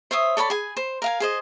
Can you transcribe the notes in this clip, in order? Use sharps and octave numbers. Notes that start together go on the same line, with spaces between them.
C5 C#5 E5 D#6
A4 C#5 D5 B5
G#4 G#5
C5
A#4 F5 G#5
G#4 C5 D#5